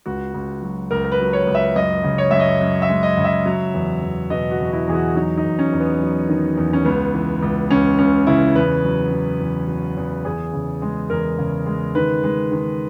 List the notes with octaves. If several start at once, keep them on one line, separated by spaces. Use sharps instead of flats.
C#2 F#4
C#2
F#3
C#2 A#4
A#4
B4
F#3
C#5
C#2
E5
F#2 D#5
C#3
C#5
F#2 E5
D#5
F#2
E5
G#3
D#5
C#3
E5
F#3
E2
E2
B2 D#5
F#4
E2
E4
E2 G#4
F#4
F#3 D#4
D#4
E2
C#4
E2
B3
F#3
D#3
E2
C#4
C#2 B3
E3
C#2
C#2 C#4
C#2 C#4
C#3 E4
E2 B4
F#3
F#3
E2
F#3
E2
E2 G#4
C#3
G#3
E2 A#4
C#3
G#3
D#3 B4
G#3
D#3